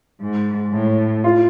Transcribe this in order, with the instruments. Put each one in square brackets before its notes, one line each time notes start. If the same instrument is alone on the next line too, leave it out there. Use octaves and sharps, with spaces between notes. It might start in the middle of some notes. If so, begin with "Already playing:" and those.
[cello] G#2
A2
[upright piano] F4